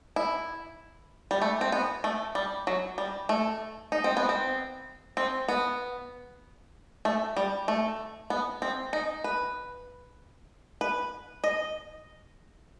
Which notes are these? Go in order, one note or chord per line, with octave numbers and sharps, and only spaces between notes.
E4
G3
A3
C4
B3
A3
G3
F#3
G3
A3
D#4
C4
B3
C4
C4
B3
A3
G3
A3
B3
C4
D#4
B4
B4
D#5